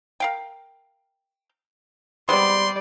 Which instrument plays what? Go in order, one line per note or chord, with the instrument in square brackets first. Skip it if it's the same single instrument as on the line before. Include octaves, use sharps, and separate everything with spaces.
[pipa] A#4 F5 G5
[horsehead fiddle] G3 D5 [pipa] G#3 B3 C4 [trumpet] C6